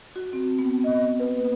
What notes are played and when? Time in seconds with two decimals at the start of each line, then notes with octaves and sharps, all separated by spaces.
0.16 F#4
0.33 C4
0.59 B3
0.84 D#5
1.20 B4
1.34 A#3